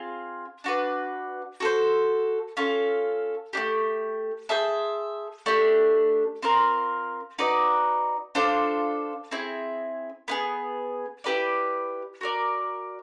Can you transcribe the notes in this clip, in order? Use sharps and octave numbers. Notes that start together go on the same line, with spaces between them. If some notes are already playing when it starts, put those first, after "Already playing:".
Already playing: C4 F4 G#4
D4 F#4 B4
F#4 A4 C5
C#4 F4 A4
A3 D4 G4
G#4 C5 E5 A5
A3 D4 G4
C4 F4 A#4
D#4 F#4 B4 D5
D4 F4 A4 C5
C4 E4 G#4
B3 E4 G#4
E4 G4 B4 D5
F#4 A#4 D5